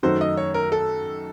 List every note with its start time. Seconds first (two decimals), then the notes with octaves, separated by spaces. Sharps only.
0.03 F#2 D#3 A3 D#4 F#4 C5
0.21 D#5
0.37 C#5
0.54 A#4
0.72 A4